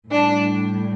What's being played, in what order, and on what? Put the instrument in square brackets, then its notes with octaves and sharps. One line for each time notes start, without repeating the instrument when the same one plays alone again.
[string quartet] A2 G3 D4